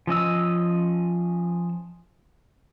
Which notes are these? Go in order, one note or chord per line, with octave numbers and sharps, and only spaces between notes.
F3 C#4 D#5 E6